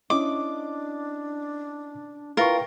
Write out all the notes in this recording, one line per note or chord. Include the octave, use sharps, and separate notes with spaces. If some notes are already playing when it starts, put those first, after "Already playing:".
C#4 D4 E4 D#5 D6
E4 F4 A#4 B4 G5 C#6